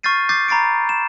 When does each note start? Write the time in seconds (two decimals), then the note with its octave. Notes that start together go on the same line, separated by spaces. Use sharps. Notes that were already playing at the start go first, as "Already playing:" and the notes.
0.03 C#6 F6 G6 A6 C7 D#7
0.29 D6 G6 A6 C7
0.48 A#5 B5 A6 C7 D7
0.89 E7